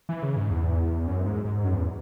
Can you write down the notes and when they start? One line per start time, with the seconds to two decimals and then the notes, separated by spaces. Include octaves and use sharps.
0.09 E3
0.23 C#3
0.37 G#2
0.50 E2
1.07 F#2
1.26 G#2
1.45 G#2
1.64 F#2
1.74 E2